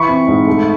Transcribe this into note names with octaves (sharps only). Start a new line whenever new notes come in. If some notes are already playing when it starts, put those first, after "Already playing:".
Already playing: E3 B5 C#6
C4
G#2
A3